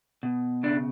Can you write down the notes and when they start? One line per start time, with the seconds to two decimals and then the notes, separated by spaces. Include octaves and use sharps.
0.23 B2
0.63 C#3 D4